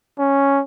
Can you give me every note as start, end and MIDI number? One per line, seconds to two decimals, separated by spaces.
0.18 0.61 61